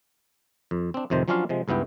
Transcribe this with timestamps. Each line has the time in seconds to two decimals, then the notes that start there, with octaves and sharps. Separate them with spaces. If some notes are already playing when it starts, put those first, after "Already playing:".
0.71 F2
0.94 C4 D4
1.10 F2 A2 C3 D#3 C5 A5
1.28 F3 F#3 C#4 D4 F4 F5
1.49 C3 F3 G#3
1.68 C#2 G2 B3 E4 G5